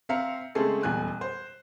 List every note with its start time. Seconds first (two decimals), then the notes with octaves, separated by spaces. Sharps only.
0.09 C4 E5 F5 A#5 C#7
0.55 C#3 G#3 A3 C4 G#4 A4
0.83 D#1 E2 G#5 F#6
1.21 C5